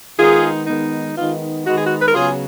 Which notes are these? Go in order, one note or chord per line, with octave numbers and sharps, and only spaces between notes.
D#3 G#3 B3 D#4 F4 G#4
D#3 G#3 B3 D#4
D#3 G#3 B3 D#4 F4
D#3 G#3 B3 D#4 F#4
G#4
F#4
B4
A#4
C#3 F#3 B3 F4 G#4